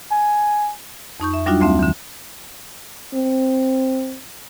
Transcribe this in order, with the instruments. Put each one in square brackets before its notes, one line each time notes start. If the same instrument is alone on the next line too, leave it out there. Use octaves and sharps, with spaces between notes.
[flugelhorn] G#5
[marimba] F2 D#4 C#6 G6
E5
F#3 G3 D4 D#4 F4 F#4
D2 A3 C4 E5 F5
D3 E3
[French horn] C4